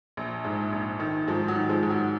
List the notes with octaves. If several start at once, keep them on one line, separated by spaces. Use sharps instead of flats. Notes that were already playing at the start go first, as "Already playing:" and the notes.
A#1
G#2
A#1
D#3
G#2 F3
F#3
D#3
F3 G#3
G#2
F#3